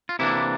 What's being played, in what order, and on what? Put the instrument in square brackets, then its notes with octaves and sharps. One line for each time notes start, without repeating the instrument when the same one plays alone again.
[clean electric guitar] F4
C3 E3 A#3 D4 E4